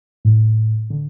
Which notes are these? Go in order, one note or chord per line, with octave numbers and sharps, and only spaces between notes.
A2
D3